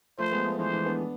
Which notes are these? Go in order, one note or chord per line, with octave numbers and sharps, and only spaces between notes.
F3 A3 C5
G#3 B3
F3 A3
E3 G#3 C5
E3 G#3
B3 D4